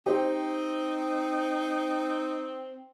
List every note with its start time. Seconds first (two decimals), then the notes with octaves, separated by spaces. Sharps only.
0.06 C4 D#4 G4 C5